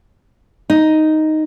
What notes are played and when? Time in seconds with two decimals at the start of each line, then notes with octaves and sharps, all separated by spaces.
0.70 D#4